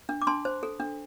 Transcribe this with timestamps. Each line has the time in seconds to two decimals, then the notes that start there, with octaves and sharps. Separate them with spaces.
0.09 D4
0.22 D6
0.27 D4 A5 C6
0.45 C5
0.63 A4
0.80 D4